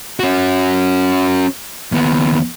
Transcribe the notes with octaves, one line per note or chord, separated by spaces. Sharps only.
C#4 F#4
D#2 B3